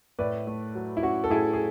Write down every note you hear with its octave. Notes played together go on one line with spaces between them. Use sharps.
A2 B4 D5
A3
F#3
E4
C#4 F#4
A4
A2 E4 G#4
G#4